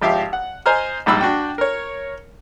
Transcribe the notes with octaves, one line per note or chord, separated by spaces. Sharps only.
G#1 F3 G4 E5 F5
F#5
C5 D#5 G#5 A#5 F6
A#1 G#2 G3 B5 E6
D4 F#4 G5
A#4 C#5